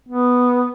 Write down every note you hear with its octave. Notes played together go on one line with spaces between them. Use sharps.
B3